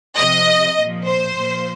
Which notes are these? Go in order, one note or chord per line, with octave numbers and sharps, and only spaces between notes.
C3 F3 D#5
A#2 F3
C5
A#2 F3